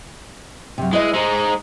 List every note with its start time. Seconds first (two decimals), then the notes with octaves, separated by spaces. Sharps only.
0.78 F#2 C3
0.93 G#3 E4 B4 D#5
1.14 G#3 D#4 G#4 C5